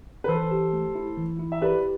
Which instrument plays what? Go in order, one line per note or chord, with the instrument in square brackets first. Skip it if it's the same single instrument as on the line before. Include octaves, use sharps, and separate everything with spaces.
[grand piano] B4
[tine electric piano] E3 [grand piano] A4 C5
[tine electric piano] G4
A3
E4
E3
E4
[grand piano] E5
[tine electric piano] G4 [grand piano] B4 D5